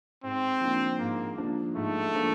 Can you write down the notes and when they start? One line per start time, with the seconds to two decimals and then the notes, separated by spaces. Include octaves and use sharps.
0.23 G#2 C4
0.61 F3 A#3 D4
0.99 G#2 A#3
1.38 F3 A#3 D4
1.76 G#2 A3
2.14 F3 A#3 D4